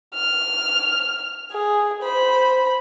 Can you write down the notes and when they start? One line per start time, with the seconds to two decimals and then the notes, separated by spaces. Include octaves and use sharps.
0.14 F6
1.52 G#4
2.02 C5 B5